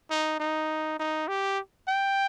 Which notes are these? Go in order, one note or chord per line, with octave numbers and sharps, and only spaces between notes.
D#4
D#4
D#4
G4
G5